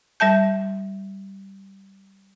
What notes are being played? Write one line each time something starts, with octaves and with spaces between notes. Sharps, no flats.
G3 E5 A5 G6